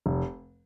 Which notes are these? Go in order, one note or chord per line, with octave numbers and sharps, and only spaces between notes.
F1